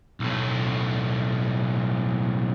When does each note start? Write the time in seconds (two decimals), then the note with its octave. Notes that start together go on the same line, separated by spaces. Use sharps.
0.20 B1 A2